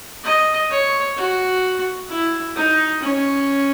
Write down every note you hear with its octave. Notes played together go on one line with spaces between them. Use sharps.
D#5
C#5
F#4
E4
D#4
C#4